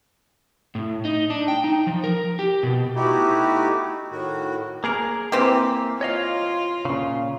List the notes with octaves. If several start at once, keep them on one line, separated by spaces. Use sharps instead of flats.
A2
D#4
D4
G5
D#4
F3
A#4
G4
B2
A3 B3 D#4 E4 F#4 G4
A2 D#3 F#4
A#3 G#4 A#4
E3 A#3 C4 G4
F4 C#5 D#5 F5
A#2 C#3